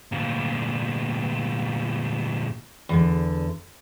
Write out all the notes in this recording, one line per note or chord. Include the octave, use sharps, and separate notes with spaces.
D2 A#2
E2 D3